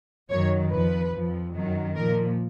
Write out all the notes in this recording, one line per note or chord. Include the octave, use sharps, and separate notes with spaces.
F#2 D#3 F#3 C#5
F2 F3 B4
F2 F3
F#2 D#3 F#3
A#2 F3 A#4